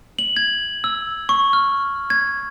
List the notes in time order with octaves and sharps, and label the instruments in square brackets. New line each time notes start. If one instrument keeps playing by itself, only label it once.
[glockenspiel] F#7
G#6
E6
C#6
F6
G#6